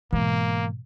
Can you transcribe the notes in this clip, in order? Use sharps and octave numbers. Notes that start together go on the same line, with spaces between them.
G#2 B2 E3 G#3 A#3